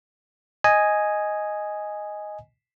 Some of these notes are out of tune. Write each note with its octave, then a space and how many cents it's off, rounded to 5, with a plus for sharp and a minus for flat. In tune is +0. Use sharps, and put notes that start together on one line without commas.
D#5 +0 G#5 +0